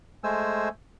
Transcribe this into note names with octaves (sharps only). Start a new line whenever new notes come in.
G#3 A3 C5 G#5 E6